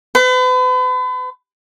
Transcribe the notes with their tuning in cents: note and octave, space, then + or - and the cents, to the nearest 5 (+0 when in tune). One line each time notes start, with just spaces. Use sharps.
B4 +40